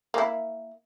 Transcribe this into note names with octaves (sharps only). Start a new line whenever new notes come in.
A#3 E4